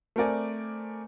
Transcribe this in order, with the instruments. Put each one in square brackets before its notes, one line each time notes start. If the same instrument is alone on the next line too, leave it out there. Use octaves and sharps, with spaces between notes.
[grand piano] A3 C4 A#4 D5 G#5